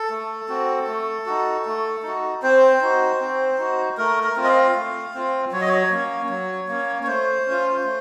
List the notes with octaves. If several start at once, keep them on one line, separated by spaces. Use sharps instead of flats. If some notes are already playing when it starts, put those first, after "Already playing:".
Already playing: A4
A3
C4 F#4
A3
D#4 F#4
A3
D#4 F#4
C4 C5
D#4 F#4
C4
D#4 F#4
A3 A#4
A#4
C4 F4
D#5
F5
A3
C4 F4
F#3 C#5
D#5
C#5
A#3 C#4
F#3
A#3 C#4
C#5
A3 C5
C#4
F4
A3